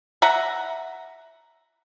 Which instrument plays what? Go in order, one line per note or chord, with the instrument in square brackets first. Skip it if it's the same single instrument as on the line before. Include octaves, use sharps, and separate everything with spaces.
[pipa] E5 F#5 A#5